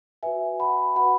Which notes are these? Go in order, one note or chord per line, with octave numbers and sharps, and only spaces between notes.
F#4 B4 E5 G#5
F#5 B5
F#4 B4 F#5 B5